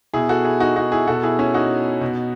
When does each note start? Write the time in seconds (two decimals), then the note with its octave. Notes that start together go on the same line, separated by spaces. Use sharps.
0.13 B2 E4 G#4
0.29 F#4 A4
0.45 E4 G#4
0.60 D#4 F#4
0.76 D#4 F#4
0.92 E4 G#4
1.07 B2 F#4 A4
1.23 E4 G#4
1.39 C#4 E4
1.54 D#4 F#4
2.01 B2